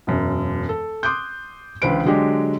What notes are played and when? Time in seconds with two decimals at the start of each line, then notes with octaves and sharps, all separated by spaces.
0.07 E1 F#2
0.69 A4
1.03 C6 D6 D#6 F#6 G6
1.82 C#2 D3 E3 B4 C5 D7
2.05 D3 F#3 G#3 D4 G4